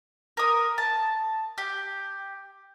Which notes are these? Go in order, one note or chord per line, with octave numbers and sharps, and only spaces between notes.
A#4 D#6
A5
G4